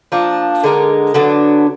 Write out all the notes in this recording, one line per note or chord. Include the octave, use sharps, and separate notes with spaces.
F3 A#3 D4
D3 G#3 D#4 A#4
D3 F#3 B3 D4